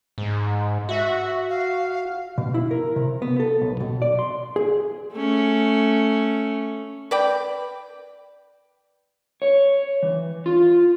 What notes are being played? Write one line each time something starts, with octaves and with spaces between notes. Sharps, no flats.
G#2
F#4 E5
F5
B2
E4
A#4
C3
B3
A4
B1
B2
D5
C6
G#4
A3 C#4
B4 D5 G5
C#5
E3
F4